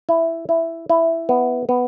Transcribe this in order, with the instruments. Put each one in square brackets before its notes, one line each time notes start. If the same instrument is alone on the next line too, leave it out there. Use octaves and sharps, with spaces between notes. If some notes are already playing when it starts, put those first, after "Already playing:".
[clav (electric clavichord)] E4
E4
E4
B3
B3